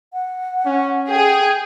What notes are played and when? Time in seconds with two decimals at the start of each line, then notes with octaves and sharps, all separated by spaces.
0.13 F#5
0.66 C#4
1.10 G#4 G5